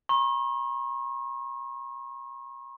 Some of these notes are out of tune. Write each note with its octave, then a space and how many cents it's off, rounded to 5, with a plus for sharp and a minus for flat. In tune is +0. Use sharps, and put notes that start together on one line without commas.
A#5 +45 C#6 -40